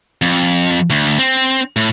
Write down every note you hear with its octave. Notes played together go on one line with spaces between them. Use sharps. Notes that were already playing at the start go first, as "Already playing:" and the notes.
F2
D2
C4
A2